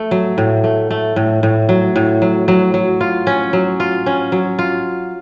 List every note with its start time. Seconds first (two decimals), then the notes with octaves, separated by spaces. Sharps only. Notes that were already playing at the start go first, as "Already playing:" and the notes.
Already playing: A3
0.11 F#3
0.38 A2
0.64 A3
0.91 A3
1.16 A2
1.43 A2
1.69 F#3
1.96 A2
2.22 F#3
2.48 F#3
2.74 F#3
3.01 F4
3.27 C#4
3.53 F#3
3.80 F4
4.06 C#4
4.32 F#3
4.59 F4